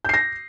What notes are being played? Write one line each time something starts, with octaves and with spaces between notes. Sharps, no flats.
G6 A#6 C7